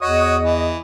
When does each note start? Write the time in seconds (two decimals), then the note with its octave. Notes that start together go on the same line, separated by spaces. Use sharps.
0.02 E2 F#4 C#5 D#5 D#6
0.43 E3